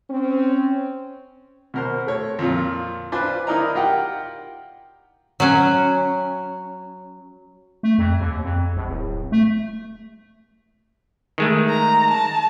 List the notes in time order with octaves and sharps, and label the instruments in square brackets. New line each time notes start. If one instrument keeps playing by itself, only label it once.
[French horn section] C4 C#4
[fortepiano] B2 A#4 C5
A3 C#5
F2 A#2 F4
D4 F4 B4 C5 G#5
D#4 E4 A#4 D5 D#5 A#5
F4 G4 A#4 F#5 G5
[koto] F#3 C#4
[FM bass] A3
F2
D#2
F2
A#1
D1
A3
[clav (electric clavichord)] D#3 G#3 A3
[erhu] A#5
A5